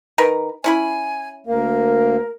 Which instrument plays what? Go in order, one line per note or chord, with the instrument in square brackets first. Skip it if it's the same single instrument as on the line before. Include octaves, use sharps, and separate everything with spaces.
[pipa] D#3 A#4 B4
[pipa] C#4 E4 B5 [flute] G#5
[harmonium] D2 A#3 [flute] A#4